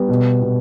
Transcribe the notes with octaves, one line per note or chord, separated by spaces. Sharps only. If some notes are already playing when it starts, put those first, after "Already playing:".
Already playing: G3 B3
B2
B2